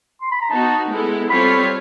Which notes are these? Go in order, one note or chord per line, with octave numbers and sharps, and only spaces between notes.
C6
B5
A#5
B3 D#4 F#4 A5
G#3 B3 E4 A4
G3 C4 F4 A4 C#5 B5